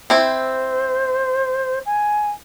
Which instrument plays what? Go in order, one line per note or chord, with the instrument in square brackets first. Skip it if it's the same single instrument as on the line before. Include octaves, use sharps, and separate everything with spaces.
[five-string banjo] C4 E4 [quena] C5
[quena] G#5